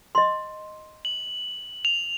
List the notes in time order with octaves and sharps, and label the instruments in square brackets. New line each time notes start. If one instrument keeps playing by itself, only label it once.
[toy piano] D#5 C6
[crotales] F#7
F7